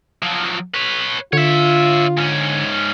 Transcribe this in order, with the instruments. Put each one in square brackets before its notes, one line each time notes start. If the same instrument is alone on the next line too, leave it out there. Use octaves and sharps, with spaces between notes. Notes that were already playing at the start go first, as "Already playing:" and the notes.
[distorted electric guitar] F3 F#3
B4 C#5
[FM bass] D3 [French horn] F4 [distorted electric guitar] C#5 E5
[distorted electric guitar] G#2 C#4